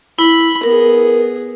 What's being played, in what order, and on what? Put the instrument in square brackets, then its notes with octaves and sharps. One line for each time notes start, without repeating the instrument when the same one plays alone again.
[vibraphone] E4 [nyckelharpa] B5
[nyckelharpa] B3 G#4 [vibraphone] A#4